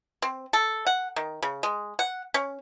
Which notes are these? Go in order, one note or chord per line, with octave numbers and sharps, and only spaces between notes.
C4
A4
F#5
D#3
C#3
G#3
F#5
C#4